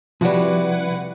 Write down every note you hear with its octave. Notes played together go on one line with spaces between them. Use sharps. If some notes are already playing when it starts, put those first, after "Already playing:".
C3 F3 G3 E4 F#4 B4 F#5